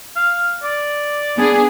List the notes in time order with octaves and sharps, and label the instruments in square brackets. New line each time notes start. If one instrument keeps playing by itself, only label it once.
[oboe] F5
D5
[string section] B3 D4 G#4